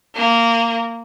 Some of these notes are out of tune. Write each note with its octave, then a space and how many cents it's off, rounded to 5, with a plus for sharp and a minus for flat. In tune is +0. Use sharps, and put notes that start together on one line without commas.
A#3 -15